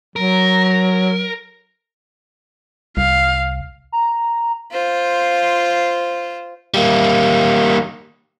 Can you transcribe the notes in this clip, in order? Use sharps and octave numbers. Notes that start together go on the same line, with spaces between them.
F#3 A#4
C2 F5
A#5
F4 C5
G3 A#3